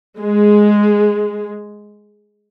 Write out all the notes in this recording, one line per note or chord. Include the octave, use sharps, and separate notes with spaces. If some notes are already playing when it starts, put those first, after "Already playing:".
G#3